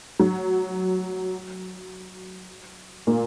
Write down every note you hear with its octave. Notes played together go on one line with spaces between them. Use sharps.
F#3
A#2 A#3